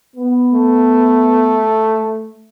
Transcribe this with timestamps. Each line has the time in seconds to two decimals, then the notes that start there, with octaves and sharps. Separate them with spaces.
0.15 B3
0.53 A3